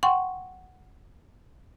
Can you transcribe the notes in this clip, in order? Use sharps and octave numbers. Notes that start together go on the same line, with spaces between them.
F#5 G5 C6 C#6